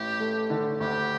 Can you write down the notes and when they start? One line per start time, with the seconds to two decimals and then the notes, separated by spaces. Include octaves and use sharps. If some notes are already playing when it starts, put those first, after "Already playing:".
Already playing: A1 G4
0.20 A3
0.50 D3
0.80 D2 G4